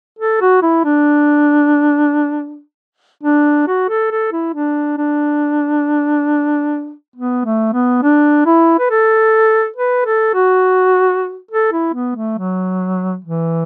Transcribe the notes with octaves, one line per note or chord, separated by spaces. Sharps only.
A4
F#4
E4
D4
D4
F#4
A4
A4
E4
D4
D4
B3
A3
B3
D4
E4
B4
A4
B4
A4
F#4
A4
E4
B3
A3
F#3
E3